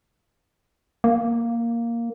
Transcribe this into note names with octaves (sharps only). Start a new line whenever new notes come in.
A#3